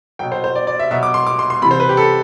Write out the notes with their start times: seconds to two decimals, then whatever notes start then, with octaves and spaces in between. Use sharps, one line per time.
0.19 B2 F#3 G5
0.32 C5
0.44 C5
0.55 D5
0.67 D5
0.79 E5
0.91 B2 F#3 E5
1.03 D6
1.14 C6
1.27 D6
1.39 C6
1.50 C6
1.62 C3 E3 B5
1.71 C5
1.80 B4
1.89 G4
1.97 A4